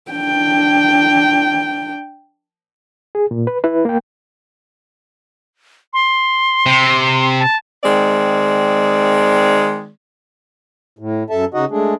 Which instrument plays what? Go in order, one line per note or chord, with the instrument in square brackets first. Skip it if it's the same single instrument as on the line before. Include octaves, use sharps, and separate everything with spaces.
[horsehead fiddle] D4 G5
[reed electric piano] G#4
A#2
B4
E4 B4
A#3 G5
[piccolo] C6
[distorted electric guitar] C3
[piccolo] A5
[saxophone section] D#3 G#3 C4 D5
[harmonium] A2
F#2 A4 E5 A5
C#3 D#4 F#4 D#5 F#5
G#3 A3 D4 G#4